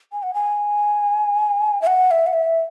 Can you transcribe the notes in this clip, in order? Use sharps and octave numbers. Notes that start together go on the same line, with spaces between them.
G#5
F#5
G#5
E5
F#5
E5
F#5
E5